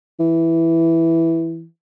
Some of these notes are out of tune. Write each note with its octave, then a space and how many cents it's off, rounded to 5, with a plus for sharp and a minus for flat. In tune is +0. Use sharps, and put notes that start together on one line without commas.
E3 +0